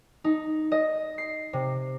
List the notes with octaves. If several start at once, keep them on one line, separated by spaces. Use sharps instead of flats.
D#4
D#5
C7
C3